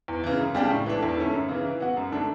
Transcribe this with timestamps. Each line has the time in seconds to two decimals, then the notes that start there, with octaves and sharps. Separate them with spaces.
0.08 E2
0.24 C#3 E3
0.40 F#2
0.54 C#3 G3 D4 G4
0.70 A2
0.86 E3 A3 D4
1.03 E2
1.17 D3 A3 C#4 E4
1.34 F#2
1.49 C#3 E3
1.65 E3
1.80 B3 F#4
1.97 F#2
2.12 D3 A3 D4